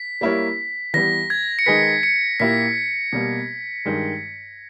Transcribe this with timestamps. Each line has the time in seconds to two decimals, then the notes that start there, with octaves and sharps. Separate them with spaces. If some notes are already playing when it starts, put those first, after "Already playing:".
Already playing: B6
0.21 G3 A#3 E4 A#4 C#5
0.94 E3 G3 B3 A#6
1.30 G#6
1.59 C#7
1.66 D#3 G#3 D#4 G#4 B4 B6
2.03 C#7
2.40 A#2 A#3 E4 G4 B6
3.13 B2 G3 A#3
3.85 G2 D#3 G#3